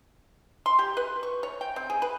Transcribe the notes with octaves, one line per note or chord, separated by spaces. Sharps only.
C6
G4
B4
C#6
C#5
G5
C4
G#4
B4